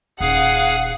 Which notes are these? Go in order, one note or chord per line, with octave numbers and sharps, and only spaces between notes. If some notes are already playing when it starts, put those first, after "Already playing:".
D#1 G#4 F5 F#5